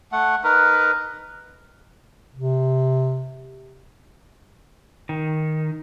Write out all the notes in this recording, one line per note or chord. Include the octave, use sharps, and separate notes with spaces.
A3 F#5
D#4 A#4 B4
C3
D#3